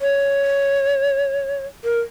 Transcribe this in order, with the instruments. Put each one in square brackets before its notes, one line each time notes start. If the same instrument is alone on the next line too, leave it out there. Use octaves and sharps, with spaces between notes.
[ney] C#5
A#4